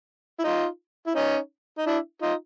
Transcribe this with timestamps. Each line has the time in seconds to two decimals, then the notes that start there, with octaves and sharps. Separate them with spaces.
0.39 E4
0.44 D#4 F4
1.07 E4
1.15 C#4 D#4
1.78 D#4
1.86 D4 E4
2.22 D#4 F4